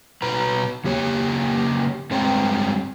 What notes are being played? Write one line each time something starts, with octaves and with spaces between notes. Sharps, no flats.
B2 B4 A#5
C#3 A#3 G4 C#5
G2 G#3 C4 C#5 G5 A#5